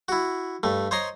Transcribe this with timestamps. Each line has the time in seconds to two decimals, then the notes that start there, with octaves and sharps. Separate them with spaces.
0.08 E4 F#4
0.63 G2 A3
0.91 C5 C#5 D#5 A#5 C6